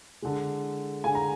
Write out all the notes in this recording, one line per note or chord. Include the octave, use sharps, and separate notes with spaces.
D3 G#3
D3 G#3 G#5
A#5